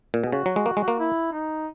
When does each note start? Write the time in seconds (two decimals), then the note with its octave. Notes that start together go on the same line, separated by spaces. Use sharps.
0.14 A#2
0.24 B2 G#4
0.32 C#3 F#4
0.46 F#3
0.56 G#3
0.66 A#3
0.77 G#3
0.88 A#3
0.99 E4
1.32 D#4